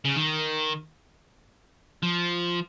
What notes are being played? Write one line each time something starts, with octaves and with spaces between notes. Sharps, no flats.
C#3
D#3
F3